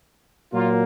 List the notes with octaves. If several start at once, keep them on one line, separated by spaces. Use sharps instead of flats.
A#2 F#3 A#3 F4